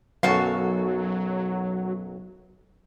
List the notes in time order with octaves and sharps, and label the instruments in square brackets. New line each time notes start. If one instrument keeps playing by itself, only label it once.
[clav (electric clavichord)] B1 F#2 [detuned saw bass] F#3 [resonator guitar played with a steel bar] F#4 A4 F5